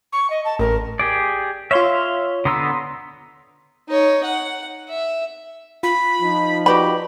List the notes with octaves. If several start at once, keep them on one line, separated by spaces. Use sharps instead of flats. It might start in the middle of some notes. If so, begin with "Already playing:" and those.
C#6
D#5
A5
A1 A#4
G4 G#4 D5
F4 C#5 E5 F5 C6
D3 B3 A#5 C6 D#6 E6
D#4 C#5
F#5
E5
F4 B5
F3 D#4
F#4 G4 B4 D5 B5